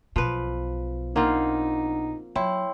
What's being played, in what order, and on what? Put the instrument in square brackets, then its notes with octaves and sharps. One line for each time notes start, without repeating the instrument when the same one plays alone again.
[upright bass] B1 B2 [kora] F3 B4
[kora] A#3 C4 F4 [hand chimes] D4 F#5 [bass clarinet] D#4
[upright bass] F#3 [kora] E4 [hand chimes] C#5 G5 C6